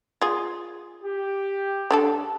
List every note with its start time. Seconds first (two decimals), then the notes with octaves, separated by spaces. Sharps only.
0.22 F4 G#4
1.04 G4
1.91 D3 D4 A4